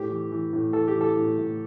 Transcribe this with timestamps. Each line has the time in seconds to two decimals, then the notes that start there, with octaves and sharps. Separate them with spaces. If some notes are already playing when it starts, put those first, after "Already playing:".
Already playing: A2 G4
0.09 E3
0.32 E3
0.53 A2
0.73 E3 A4
0.88 G4
0.95 E3
1.01 A4
1.17 A2
1.38 A2